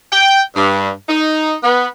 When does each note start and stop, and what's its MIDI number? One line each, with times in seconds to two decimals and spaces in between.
0.12 0.40 79
0.55 0.90 43
1.08 1.55 63
1.62 1.86 59